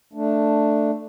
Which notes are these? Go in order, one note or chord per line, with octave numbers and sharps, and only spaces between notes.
A3 D4